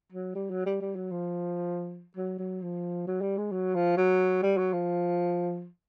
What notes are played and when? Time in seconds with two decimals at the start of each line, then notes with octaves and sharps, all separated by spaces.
0.13 F#3
0.35 G3
0.50 F#3
0.66 G3
0.81 G3
0.96 F#3
1.11 F3
2.17 F#3
2.39 F#3
2.62 F3
3.07 F#3
3.21 G3
3.38 G#3
3.52 F#3
3.75 F3
3.97 F#3
4.43 G3
4.57 F#3
4.73 F3